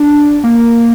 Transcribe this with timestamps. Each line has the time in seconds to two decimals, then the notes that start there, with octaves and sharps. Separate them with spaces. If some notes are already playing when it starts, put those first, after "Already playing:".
Already playing: D4
0.44 A#3